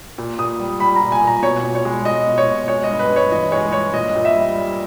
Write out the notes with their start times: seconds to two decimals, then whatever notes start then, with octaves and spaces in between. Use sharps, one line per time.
0.18 A#2
0.39 A#2 D#6
0.60 G3
0.80 G3 B5
0.96 A#5
1.02 A#2
1.12 G#5
1.22 A#2
1.27 A#5
1.42 B2 C#5
1.64 B2
1.75 C#5
1.85 G#3
2.05 G#3 D#5
2.27 B2
2.38 C#5
2.47 B2
2.68 G#3 C#5
2.84 D#5
2.90 G2
2.99 B4
3.10 G2
3.16 C#5
3.32 E3 D#5
3.52 G#3 C#5
3.72 G2 C#5
3.93 A#2 D#5
4.15 A#2
4.25 E5
4.36 G3
4.56 G3